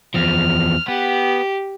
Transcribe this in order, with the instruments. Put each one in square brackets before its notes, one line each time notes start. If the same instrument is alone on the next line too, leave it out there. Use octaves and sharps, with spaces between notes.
[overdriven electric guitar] E2 F3 [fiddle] F6
[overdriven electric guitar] B3 [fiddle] G4